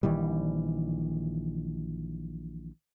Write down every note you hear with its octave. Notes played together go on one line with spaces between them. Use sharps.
A#1 D#3 E3 G3